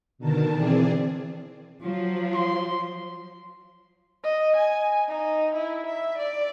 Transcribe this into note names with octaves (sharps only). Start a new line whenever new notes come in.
B2 D3 D#3 A#4 A5
E3 C4 G#4 D5
F3 F#3
C6
D#5
G#5
D#4
E4
E5
D5